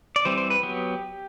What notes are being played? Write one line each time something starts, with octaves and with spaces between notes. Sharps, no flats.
D5
E3 G3 C4 C5
C5
B4
F#3 B3 G4